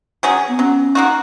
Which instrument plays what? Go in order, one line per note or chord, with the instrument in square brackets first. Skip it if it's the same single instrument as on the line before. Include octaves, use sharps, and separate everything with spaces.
[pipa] F#3 C#4 G#4
[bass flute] B3
[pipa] F#3 [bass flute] C#4
[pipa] A#3 D#4 F#4